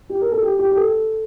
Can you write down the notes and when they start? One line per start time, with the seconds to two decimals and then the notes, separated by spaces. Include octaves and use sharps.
0.09 G4
0.21 A#4
0.31 A4
0.42 G4
0.59 G4
0.71 G4
0.75 A4